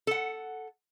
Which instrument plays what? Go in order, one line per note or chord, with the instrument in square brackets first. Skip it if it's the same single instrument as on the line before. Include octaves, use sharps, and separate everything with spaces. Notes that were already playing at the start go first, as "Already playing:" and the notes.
[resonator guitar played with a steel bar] A4 F#5